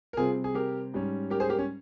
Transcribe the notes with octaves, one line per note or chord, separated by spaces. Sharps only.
A#4
C3 G3 C4 F4 G#4
G#4
G4 A#4
G#2 G3 C#4
G4 A#4
G#4 C5
G4 A#4
C#4